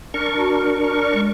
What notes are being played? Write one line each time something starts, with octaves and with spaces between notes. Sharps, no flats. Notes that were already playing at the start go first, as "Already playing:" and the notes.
D4 A#4 C#6
F#4
D5
G#3